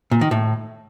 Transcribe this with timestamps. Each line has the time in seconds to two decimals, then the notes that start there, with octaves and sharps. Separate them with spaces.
0.11 A#2
0.21 D#3
0.31 A2